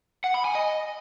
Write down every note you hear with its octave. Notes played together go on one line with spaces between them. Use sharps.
F#5
B5
G#5
D#5